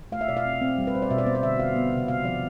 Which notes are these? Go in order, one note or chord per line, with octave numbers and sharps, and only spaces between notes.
A3 F5
E5
B2 D5
F5
C4
C4
G3
B4
G3 C5
D5
B2 E5
D5
B3 C5
D5
D3 E5
D3 F5
B3
C3
B3 F5
F3 D5